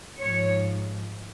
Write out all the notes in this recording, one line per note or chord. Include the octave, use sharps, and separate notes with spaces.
G#2 F3 C#5